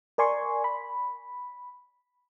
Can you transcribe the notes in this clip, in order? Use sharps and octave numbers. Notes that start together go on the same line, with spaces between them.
A#4 D5 G#5 C6 C#6
B5